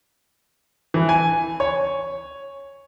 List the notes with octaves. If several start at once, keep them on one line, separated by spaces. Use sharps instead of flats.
E3
G#5
C#5